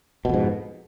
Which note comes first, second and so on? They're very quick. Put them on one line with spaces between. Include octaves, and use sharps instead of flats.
B2 F2 G#2